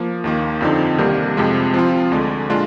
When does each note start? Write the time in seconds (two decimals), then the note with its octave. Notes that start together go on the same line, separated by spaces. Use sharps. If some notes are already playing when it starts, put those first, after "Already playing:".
Already playing: F3 A#3
0.24 D#2 D#3 A#3
0.61 F2 D3 F3 C4 D#4
0.98 C2 C3 D#3 G3 A#3
1.37 F2 C3 F3 G#3
1.74 F3 C4 F4
2.12 D2 D3 G#3
2.50 A#2 G#3 D4 F4